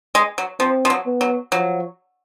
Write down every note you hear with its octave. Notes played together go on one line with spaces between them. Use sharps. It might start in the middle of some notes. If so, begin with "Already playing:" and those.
G#3
F#3
F3 C4
F3
F#3
B3
F#3
F3 F#3